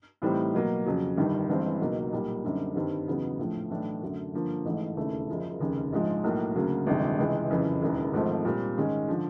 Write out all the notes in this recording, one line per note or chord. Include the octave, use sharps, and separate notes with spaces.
A2 E3 G3 C4 D#4
B2 F#3 A#3
F2 C#3 F#3
G1 G2 D#3 G3
A1 G2 E3 G#3 C4
C#2 B2 F#3 A#3 D#4
B1 A#2 G3 A#3
F#2 D3 G3 C4 D#4
G2 D#3 G3 C4
E2 C#3 F#3 B3 D#4
A#1 A2 F3 A3
B1 A2 E3 A3 D4
F#2 D3 F#3 A3
G2 D3 F3 A#3
A1 G#2 E3 A3
E1 D#2 C#3 E3 A3
F#1 F#2 C#3 F3
F1 D#2 C#3
A#1 G#2 F3 G#3
B1 A2 F#3 A#3
D2 C#3 F#3 A#3
G1 F2 C3 D#3 G#3
C#2 C3 E3 G#3
F#1 F2 C#3 E3
E1 D#2 C#3 E3
G#1 G#2 F3 A3 C4
A#2 G3 C4
G#2 D#3 G#3 C#4
D3 F3